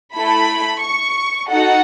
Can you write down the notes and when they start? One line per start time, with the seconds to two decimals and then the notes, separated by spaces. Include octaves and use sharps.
0.15 A3 E4 A4 B5
0.82 C#6
1.49 D#4 F#4 A4 F#5